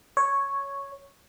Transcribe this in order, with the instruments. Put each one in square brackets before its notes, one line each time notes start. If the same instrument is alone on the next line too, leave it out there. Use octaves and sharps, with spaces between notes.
[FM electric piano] C#5